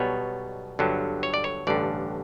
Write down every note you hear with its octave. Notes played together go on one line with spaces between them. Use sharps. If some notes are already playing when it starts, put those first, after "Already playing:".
Already playing: B1 B2 G3 B3 C#5
G1 G2 D3 F#3
C#5
D5
C#5
A1 G2 D3 D5